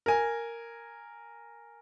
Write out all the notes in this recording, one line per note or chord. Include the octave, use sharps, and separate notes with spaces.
A#4 G#5